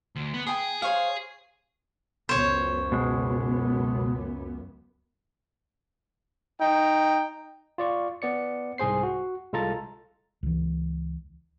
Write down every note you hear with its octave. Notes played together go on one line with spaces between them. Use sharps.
D2
B3
G#4 G5 B5 D#6
G#4 C5 C#5 F5
C#2 F#2 B3 C5 C#5
B2 G#3
D#4 G5
F4 D5 C#6
B3 D5 C#7
C2 G#2 G#4 C5 C7
F#4
C2 G#3 F4 A4 A#5 A6
C#2 E3